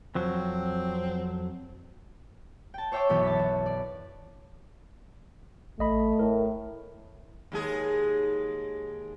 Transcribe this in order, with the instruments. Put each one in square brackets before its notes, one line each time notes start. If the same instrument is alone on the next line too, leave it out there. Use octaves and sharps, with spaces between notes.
[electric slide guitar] F2 F#3 [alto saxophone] C4
[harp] G5 A5
C5 C#5 E5 G5 C6 D6
B1 F#2 E3 B5
A5 B6
F#4
D5
[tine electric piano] A1 D#5 B5 [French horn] A3
[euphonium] A2 [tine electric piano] A#4
[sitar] D#2 G#3 G#4